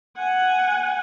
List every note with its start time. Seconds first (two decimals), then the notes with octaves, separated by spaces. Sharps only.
0.17 F#5 G#5